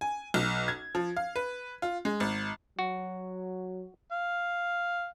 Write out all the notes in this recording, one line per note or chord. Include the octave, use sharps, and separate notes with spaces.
G#5
B1
G#6
F3
F5
B4
F4
G#3
G#1
F#3 F#4
F5